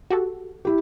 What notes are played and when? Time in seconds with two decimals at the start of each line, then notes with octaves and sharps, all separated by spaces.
0.10 F#4 G4 A4
0.65 E4 G4